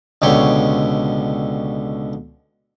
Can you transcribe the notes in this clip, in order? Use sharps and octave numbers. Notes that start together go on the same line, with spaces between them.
C#2 B2 D3 G4 C#5 C6